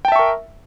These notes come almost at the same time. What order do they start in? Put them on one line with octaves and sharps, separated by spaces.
G5 A5 E5 C#6 A#4